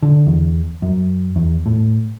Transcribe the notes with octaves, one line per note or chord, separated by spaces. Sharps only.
D3
E2
F#2
E2
A2